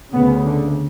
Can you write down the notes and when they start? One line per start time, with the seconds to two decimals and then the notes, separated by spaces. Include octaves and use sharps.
0.12 D2 C#3 B3
0.46 D3